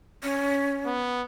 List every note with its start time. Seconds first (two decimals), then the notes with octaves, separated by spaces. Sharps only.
0.23 C#4
0.86 B3